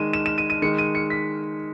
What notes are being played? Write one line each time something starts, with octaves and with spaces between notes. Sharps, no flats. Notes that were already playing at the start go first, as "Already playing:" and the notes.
Already playing: D#3 G#3 D#7 E7
E7
E7
D#7
D#7
D#3 G#3 C#7
D#7
C#7
B6